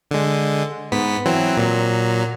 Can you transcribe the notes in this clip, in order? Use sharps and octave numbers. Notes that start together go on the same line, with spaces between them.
D3 G#3
G#2 B3 B6
E3 F#3 C4
A#2 F#3